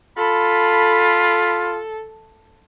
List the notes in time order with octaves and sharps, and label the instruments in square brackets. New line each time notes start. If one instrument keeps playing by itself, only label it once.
[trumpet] F4 [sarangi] A4 [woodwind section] B5